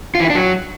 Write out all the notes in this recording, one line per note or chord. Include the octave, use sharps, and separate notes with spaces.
F4
E3
E4
D4
F#3